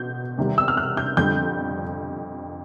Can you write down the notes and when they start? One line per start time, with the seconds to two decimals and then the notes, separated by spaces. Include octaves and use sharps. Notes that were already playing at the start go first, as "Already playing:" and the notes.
Already playing: B2 G6
0.38 E2 C3 D#3 G3
0.58 E6
0.68 F6
0.77 F#6
0.97 G6
1.17 F2 D3 G3 G6